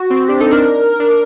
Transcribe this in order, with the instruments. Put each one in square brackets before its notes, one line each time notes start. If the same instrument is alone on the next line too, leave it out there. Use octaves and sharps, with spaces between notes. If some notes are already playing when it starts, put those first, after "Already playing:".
Already playing: [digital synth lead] F#4
[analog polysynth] C4
[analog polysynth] D4 [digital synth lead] G4
[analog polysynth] D#4 [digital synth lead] A4
[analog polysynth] D4 [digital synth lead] A#4
[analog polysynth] D4